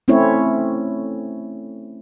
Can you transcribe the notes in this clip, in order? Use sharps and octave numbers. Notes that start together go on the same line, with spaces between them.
A3 C4 C#4 E4 C#5